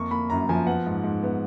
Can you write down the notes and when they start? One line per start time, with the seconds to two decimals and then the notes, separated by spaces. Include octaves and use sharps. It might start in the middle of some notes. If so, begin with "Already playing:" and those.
Already playing: F2 A#3 C#6
0.11 A#3 B5
0.30 F#2 A#5
0.49 F3 G#5
0.67 B3 F#5
0.86 G#2
1.04 G#2
1.23 B3